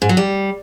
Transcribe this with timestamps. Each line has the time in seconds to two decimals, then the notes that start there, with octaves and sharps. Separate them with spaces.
0.02 G#2
0.09 F#3
0.17 G3